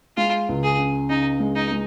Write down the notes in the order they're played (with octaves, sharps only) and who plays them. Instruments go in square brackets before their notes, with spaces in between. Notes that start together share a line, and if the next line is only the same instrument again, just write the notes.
[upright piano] G#3 [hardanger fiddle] F4
[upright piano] C#2
[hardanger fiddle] G#4
[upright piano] C#3
[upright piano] C#3 [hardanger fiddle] D#4
[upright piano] G#3
[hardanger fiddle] D#4
[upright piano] G#3